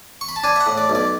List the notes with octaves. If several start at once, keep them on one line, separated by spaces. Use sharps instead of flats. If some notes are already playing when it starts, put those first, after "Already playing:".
C#6
B5
A5
D4 G#5
E5
F#5
A2
D5
B1
D5